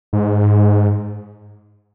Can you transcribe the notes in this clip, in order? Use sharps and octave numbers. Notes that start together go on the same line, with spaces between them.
G#2